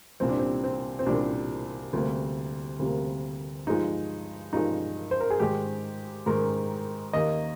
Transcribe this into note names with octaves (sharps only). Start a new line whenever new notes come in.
C2 A#2 G3 C4
D4
C4
C4
C4
C2 A#2 G3 D4
D2 C3 G3 A#3
D2 C3 G3 A#3
G2 F3 G#3 D#4
G2 F3 G#3 D#4
C5
A#4
G#4
G#2 D#3 G#3 G4
G#2 D#3 G#3 A#4
D#2 D#3 A#3 D#5